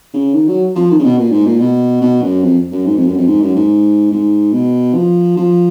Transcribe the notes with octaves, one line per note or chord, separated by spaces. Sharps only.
C#3
D#3
F#3
F3
D#3
C#3
B2
A#2
G#2
A#2
B2
B2
F#2
F2
F#2
G#2
F2
F#2
F2
G#2
F#2
G#2
G#2
B2
F3
F3